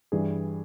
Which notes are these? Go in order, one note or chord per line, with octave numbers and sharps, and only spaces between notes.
G2 E3 G3 G#4